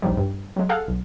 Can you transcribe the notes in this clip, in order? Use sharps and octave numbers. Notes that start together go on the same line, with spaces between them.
A#1 D#2 D#3 F3 G3
G2
F#3 G#3
G#4 A4 F5 F#5
B1